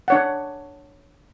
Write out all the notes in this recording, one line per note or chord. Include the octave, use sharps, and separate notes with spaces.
D4 C#5 F#5